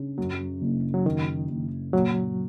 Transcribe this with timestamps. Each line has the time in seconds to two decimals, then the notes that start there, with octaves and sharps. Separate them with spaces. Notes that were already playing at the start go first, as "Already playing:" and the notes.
Already playing: C#3
0.18 F#2 F#3
0.62 F#1
0.94 F#3
1.05 F#2 D#3
1.49 F#1
1.93 A#2 F#3